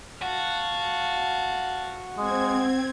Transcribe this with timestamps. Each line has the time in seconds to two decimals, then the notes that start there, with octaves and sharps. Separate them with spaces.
0.22 F#4 F5 A5
2.18 G#3 C4 G#6